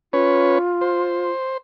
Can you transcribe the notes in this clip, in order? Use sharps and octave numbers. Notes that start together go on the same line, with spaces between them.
C#4 F4 B4 C#5
C5